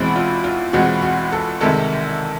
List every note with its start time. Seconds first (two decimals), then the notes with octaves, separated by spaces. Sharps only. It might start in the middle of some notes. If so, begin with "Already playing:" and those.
Already playing: E2 B2 G#3 C4 E4
0.16 F4
0.44 F4
0.73 E2 B2 G#3 C4 F#4
1.02 F#4
1.32 A4
1.60 C2 C3 D#3 G#3 A4